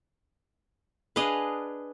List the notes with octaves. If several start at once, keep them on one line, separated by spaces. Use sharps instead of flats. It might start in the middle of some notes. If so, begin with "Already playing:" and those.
D4 G#4 B4 D#5 F5